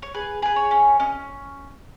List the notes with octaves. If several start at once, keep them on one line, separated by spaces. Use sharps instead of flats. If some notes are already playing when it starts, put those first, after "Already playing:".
C#5
G#4 B4
G#4 B4
C#5
C#4
C#4 D#5